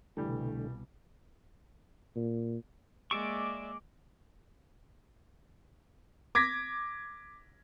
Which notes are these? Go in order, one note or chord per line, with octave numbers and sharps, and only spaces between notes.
C2 B2 D3 E3 G3 A3
A#2
G#3 A#3 D5 E5 C#6 D6
D6 G#6 A#6 B6